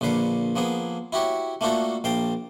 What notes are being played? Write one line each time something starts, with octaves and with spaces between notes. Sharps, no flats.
A#1 A#2 D3 B4 F5
F3 A#3 B3 G#4
E4 F#4 G4 C#5
A3 A#3 D4 F4 F#4 A4
A#1 F5 G5 A5 A#5